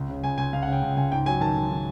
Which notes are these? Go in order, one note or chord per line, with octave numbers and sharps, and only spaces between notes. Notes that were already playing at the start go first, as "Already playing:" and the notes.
Already playing: C#2
C#3
C#2 G#5
C#2 G#5
C#2 F5
F#5
C#3
G5
C#2
C#2 G#5
G#2 G5
F#3 G#5
D#3 A5
D#3
D#3